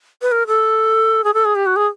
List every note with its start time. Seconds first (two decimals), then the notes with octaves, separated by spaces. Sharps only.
0.22 B4
0.31 A#4
0.47 A4
1.24 G#4
1.34 A4
1.45 G#4
1.55 G4
1.66 F#4
1.76 G#4